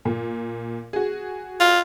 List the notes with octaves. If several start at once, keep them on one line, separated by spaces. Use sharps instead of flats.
A#2
F#4 G#4
F4